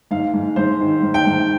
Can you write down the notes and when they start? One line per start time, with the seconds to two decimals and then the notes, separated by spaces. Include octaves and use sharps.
0.11 G#2 F5
0.34 G#2
0.56 G#2 C5
0.80 D#3
1.02 G#2
1.14 G5
1.26 G#2